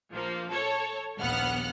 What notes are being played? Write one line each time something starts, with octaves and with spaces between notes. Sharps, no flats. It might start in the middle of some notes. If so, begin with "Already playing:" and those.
A#1 F3 A#3
A4 C#5
A#1 D#2 B3 F#5 F6 F#6